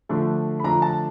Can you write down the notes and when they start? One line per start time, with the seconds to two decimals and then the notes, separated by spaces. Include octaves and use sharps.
0.09 D3 F3 A3 D4
0.60 B5
0.64 D3 F3 A3 D4 A#5
0.82 A5